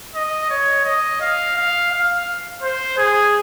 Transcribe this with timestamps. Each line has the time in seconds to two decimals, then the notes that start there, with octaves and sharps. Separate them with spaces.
0.14 D#5
0.50 C#5
0.85 D#5
1.21 F5
1.56 F5
1.92 F5
2.62 C5
2.98 G#4